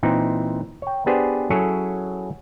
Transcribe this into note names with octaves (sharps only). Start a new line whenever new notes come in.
A#2 E3 C4 D#4
C#5 G5
B3 D4 G4 G#4 B4 C5
F#3 C#4 E4 G#4 A4 C#5